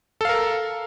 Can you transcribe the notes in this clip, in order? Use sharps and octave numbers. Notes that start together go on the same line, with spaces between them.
A4 A#4 F5